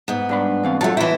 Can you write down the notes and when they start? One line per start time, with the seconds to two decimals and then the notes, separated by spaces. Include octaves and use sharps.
0.08 G#2 B3
0.29 G2 D4 B5
0.63 E3 C4 F5
0.81 F#3 A3 F4 F#4 A5
0.97 B2 E3 E4 F4 G5